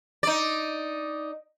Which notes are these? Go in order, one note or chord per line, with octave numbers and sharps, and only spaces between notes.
D#4 D5